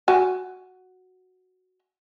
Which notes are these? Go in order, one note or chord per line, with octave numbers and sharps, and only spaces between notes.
F#4 G#5